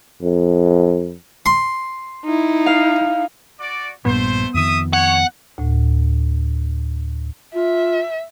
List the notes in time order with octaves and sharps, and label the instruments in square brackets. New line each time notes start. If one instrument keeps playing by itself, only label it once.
[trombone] F2
[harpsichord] C6
[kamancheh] D#4 E4
[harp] F5
[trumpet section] F#4 D5
[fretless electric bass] A#1 G2 A#2 [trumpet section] A3 C5 [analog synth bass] B3
[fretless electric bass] F2 D#3 [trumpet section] E5 D#6
[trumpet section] C#5 [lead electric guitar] F#5
[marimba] D2 A2
[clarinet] F4 [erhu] E5